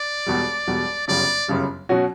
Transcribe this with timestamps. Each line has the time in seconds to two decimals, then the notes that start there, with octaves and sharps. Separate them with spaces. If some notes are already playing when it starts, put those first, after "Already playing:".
Already playing: D5
0.26 E1 E2 B2 G3
0.67 E1 E2 B2 G3
1.08 G1 F#2 C#3 G3 D5
1.48 G1 F#2 C#3 G3
1.89 B2 F#3 C#4 F#4